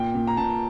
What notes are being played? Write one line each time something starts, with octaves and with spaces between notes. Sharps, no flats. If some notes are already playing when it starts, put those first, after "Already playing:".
Already playing: A#2 G5
A#2
A#5
A#2 A5